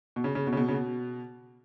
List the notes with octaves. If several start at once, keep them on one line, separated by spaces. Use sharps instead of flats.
B2
C#3
C#3
B2
C#3
B2
C#3
B2